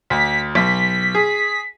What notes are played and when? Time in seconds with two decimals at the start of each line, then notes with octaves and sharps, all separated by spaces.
0.10 D2 B6
0.55 B1 B6
1.15 G#4